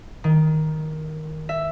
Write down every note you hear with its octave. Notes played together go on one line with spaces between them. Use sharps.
D#3
E5